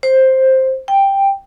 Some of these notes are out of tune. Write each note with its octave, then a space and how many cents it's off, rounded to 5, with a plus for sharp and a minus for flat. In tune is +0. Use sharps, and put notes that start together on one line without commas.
C5 +10
G5 +5